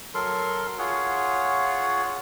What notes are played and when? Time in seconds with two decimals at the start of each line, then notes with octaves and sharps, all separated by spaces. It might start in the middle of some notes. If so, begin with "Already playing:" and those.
0.15 F#3 A4 A#4 C6
0.79 F4 G#4 C#5 F#5